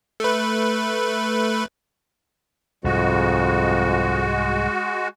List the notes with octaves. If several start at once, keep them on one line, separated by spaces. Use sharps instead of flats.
A3 B4
C2 F2 G#2 G#3 F#4